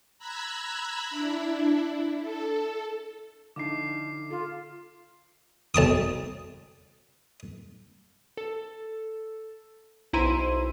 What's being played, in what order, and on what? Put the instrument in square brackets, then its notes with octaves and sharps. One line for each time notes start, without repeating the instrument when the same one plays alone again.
[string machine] A#5 B5 E6 F#6 G#6 B6
D4 E4
A4
[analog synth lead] D3 [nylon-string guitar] F3 D#4 E4 [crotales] D6 C7
[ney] F4 [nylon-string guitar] A4
[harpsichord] B1 A5 D6 D#6
[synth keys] A4
B1 E4 C5 A#5 C6 D#7